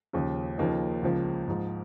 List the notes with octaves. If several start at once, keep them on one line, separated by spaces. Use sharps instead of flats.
D#2 C#3 F3
D#2 C#3 F3 A#3 D#4
C#2 C#3 F3
G#2 F3